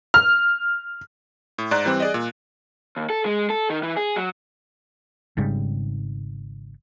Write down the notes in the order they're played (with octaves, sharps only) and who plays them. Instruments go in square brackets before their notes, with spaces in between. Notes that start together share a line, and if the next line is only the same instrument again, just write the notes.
[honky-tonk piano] F6
[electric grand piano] A2
G#2 D5 A#5 F#6
E3 G3 C4
G#4 D5 D#5
A#2
[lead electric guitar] D#2
A4
G#3
A4
D#3
E3
G#4
F#3
[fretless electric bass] G#1 G#2 C#3 G3